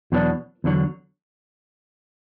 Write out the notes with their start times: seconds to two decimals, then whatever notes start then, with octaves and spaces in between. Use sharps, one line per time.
0.12 E2 B2 F#3 B3 D4
0.64 E2 D3 F#3